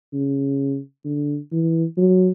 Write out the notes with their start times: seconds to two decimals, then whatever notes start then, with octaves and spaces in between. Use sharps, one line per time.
0.13 C#3
1.05 D3
1.52 E3
1.98 F#3